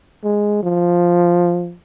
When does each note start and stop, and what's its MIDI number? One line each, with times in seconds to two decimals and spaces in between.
0.24 0.63 56
0.63 1.74 53